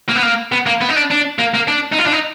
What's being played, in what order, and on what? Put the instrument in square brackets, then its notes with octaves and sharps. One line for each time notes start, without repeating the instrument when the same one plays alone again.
[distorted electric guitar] A#3
B3
A#3
B3
A#3
B3
D#4
D4
D4
A#3
A#3
D4
D#4
F4
D4
D#4